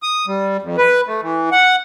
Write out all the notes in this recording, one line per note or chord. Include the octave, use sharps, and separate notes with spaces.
D#6
G3
F2
B4
A3
E3
F#5